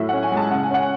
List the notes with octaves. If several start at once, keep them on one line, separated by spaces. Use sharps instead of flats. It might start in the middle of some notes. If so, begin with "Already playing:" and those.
Already playing: A2 F#3 E5
C#4 F#5
G#5
G#3
A5
C#3 F#5
G#5
C#4 F#5